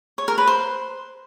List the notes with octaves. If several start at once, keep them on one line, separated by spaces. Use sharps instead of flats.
C#5
A#4
B4
C5